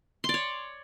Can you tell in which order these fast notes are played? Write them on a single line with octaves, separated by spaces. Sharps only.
C6 D5 C#5